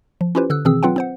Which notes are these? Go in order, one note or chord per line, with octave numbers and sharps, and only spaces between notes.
F3
C#4 E4 F4 G4 B4 C5
D3 A4 E6 F#6
B2 D#3 E3 C4 G#4 E6
F#3 C4 F4 B4 F#5 G5
C4 C5 F#5